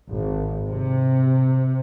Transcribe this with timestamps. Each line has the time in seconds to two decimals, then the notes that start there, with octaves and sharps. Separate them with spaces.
0.11 G#1
0.68 C3